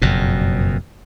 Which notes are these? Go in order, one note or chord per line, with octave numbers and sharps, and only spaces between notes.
F#1 F2 B2